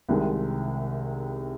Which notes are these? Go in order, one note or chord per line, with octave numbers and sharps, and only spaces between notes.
C2 C3 D#3 G#3